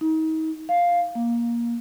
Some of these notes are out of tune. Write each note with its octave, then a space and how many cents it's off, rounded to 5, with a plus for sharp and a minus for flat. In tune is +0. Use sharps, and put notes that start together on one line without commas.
D#4 +35
F5 +5
A#3 +15